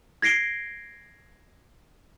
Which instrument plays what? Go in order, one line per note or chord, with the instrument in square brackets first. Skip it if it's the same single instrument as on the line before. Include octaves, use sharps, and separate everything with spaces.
[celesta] G#6 A#6 C7 D7 G7